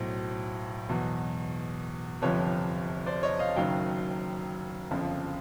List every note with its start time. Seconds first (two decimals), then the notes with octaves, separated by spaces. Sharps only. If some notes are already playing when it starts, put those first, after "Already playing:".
Already playing: B1 A2 F#3 C5
0.89 E2 B2 F#3
2.22 G1 F2 C3 F3 B4 C#5
3.06 C5 D5
3.23 C#5 D#5
3.39 D#5 F5
3.56 F#1 F#2 D#3 F#3 F5 G5
4.91 G1 F2 C#3 F3